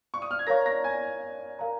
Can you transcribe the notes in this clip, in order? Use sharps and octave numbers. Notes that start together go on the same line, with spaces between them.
C#6
D#6
F6
G#6
A#4 C#5 F5 A#5 C#6 A#6
A#5 A#6
G#5 G#6
A#4 F5 A#5